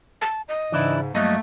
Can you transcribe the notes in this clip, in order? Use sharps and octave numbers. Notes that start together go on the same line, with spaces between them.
A5
D#5
G#2 C#3 E3 D4 E4
G2 F#3 A3 A#3 D#5